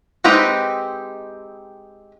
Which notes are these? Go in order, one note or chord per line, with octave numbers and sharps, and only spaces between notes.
G#3 C4 D#4 G4 B4